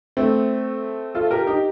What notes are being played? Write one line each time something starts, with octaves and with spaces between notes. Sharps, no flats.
A3 C4
F4 A4
G4 A#4
D#4 G4